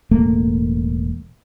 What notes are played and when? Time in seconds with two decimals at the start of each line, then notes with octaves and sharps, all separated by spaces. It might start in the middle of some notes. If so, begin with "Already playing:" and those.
0.11 E1 A2 A3 A#3